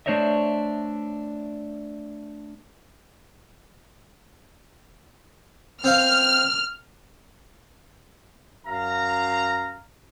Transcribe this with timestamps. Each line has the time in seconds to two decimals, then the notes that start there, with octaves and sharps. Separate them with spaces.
0.06 A3 D4 C5 C#5 D#5 E5
5.84 C4 C5 F5 F6
8.67 F#2 F5 A#5